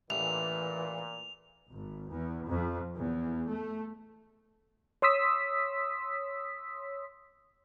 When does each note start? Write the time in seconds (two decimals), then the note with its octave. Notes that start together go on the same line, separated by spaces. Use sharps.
0.10 A1 A#2 E3 F7
1.71 G#1
2.12 E2
2.49 F2
2.95 E2
3.51 A3
5.02 C#5 C6 D#6 E6 B6